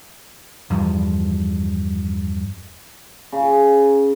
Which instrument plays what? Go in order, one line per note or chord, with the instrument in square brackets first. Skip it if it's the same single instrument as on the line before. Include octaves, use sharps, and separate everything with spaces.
[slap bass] E2 G2 F3
[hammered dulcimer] C#3